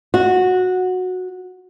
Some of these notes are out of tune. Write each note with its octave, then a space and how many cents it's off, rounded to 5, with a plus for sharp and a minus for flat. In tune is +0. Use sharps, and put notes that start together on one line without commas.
F#4 -10